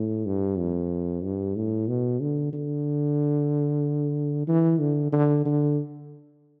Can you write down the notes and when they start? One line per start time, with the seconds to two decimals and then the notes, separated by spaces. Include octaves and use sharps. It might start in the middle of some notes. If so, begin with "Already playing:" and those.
Already playing: A2
0.26 G2
0.58 F2
1.23 G2
1.56 A2
1.88 B2
2.20 D3
2.53 D3
4.48 E3
4.80 D3
5.12 D3
5.45 D3